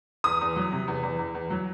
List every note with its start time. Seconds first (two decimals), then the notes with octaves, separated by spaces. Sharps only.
0.24 E2 D#6
0.41 E2
0.56 F#3
0.72 C3
0.88 E2
1.03 E2
1.19 E2
1.35 E2
1.50 F#3